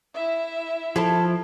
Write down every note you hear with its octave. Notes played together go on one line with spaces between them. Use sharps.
E4 E5
F3 E4 A4 A5